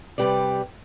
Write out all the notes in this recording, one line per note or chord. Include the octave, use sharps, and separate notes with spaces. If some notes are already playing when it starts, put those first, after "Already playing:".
C3 G3 G4 B4 D5